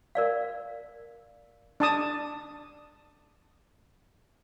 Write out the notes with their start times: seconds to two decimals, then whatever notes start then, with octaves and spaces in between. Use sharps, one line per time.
0.15 A#4 D5 F5
1.80 D4 A5 D#6